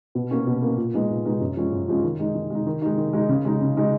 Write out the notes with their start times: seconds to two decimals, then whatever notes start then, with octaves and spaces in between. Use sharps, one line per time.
0.15 B2
0.31 A#3 C#4
0.47 B2
0.62 A#3 C#4
0.77 A#2
0.94 G#3 B3 D#4
1.09 A#2
1.25 G#3 B3 D#4
1.41 F#2
1.57 F3 G#3 C#4
1.73 F#2
1.88 F3 G#3 C#4
2.04 D#3
2.19 G#3 D#4
2.35 D#3
2.50 G#3 D#4
2.67 D#3
2.82 G#3 D#4
2.97 D#3
3.13 G#3 D#4
3.29 C#3
3.45 G#3 D#4
3.61 C#3
3.77 G#3 D#4